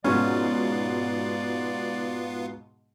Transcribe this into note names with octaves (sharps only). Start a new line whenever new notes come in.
G#2 B2 F3 B3 C#4 F4 D5